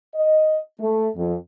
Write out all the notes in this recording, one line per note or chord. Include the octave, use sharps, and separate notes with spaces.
D#5
A3
F2